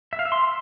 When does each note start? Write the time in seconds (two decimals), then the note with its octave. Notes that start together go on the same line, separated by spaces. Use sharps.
0.13 E5
0.19 F5
0.25 E5
0.32 C6